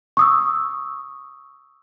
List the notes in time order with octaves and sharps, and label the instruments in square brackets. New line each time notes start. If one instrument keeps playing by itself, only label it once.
[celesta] C#6 D#6 E6